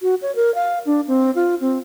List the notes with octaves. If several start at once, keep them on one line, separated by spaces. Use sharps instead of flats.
F#4
C#5
A#4
F5
D4
C4
F4
C4